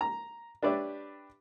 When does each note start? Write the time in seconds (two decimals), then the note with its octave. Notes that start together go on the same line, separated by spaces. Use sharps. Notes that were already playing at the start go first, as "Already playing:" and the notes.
0.01 A#5
0.63 D4 G4 B4 C#5 D5 E5